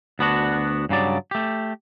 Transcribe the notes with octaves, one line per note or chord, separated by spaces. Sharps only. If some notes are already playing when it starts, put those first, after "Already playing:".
D2 B3 D4 F#4
G2 C#3 F#3 D5
A3 G4